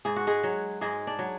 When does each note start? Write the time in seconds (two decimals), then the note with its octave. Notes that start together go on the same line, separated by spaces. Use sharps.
0.05 G#2 G#4
0.16 F#4
0.27 G#3 G#4
0.43 F#3
0.81 G#2 G#3 G#4
1.07 D4 D5
1.19 F#3